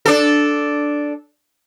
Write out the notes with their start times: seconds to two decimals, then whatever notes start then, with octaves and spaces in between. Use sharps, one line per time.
0.06 D4 A4